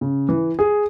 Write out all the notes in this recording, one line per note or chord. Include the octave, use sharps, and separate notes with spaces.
C#3
E3
G#4